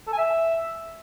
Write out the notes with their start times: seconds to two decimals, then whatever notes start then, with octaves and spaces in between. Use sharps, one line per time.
0.07 A4
0.13 G#5
0.18 E5